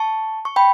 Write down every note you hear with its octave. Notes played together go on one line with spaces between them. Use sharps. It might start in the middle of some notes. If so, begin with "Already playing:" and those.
Already playing: A5 C#6
C#6
G5 B5